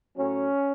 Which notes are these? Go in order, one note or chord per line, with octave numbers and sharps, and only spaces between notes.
A2 F#3 C#4